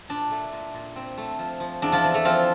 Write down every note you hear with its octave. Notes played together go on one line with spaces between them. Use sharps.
A#2 D4
A3
A#2
A#2
C4
A3
F3
F3
E2 D4
F3 F4
E3
A3 A4
F3 C4 F4